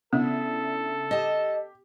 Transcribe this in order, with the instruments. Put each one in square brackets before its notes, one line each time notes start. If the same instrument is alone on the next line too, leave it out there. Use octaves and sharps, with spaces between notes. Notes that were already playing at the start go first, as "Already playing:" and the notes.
[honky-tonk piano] C#3 D4 E4 [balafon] B3 [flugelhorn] A4
[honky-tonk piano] G4 [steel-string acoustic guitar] D#5 A5